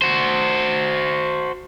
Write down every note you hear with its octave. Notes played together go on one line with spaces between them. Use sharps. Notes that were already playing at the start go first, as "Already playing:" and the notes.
F#4 C5